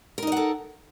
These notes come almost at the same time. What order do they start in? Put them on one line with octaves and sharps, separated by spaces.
A#4 D#4 D#5 F#5 A4